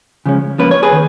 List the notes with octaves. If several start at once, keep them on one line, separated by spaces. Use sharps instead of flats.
C#3 F3 G#3 C#4
F3 A#3 C#4 B4
C#5
G#4 B4
D#3